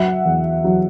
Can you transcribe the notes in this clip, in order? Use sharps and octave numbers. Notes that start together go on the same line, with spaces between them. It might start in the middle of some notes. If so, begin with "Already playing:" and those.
Already playing: F#3 E5 F#5
E2
F#3